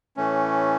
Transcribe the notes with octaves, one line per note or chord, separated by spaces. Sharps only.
A2 E3 A3 C#4